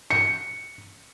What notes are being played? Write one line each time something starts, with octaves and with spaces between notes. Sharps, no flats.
C#7